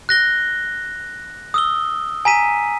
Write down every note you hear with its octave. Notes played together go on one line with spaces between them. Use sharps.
F#6 A#6 G7
D#6 E6 G7
G#5 A#5 B6 D#7